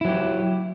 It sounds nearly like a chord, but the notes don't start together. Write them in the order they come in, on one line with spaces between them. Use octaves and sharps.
E4 F#3 G4